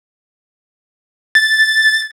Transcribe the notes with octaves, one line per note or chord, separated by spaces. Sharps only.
A6